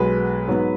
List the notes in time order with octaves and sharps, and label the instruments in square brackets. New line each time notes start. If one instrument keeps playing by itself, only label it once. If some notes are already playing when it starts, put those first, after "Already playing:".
Already playing: [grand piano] B1 B2 G#3 B3 B4
G#2 F#3 B3